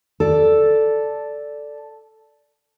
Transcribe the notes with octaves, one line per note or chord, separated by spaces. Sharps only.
A4 D5